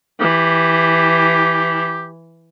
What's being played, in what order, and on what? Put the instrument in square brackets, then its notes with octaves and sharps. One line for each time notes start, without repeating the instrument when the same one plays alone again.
[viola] E3 [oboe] G4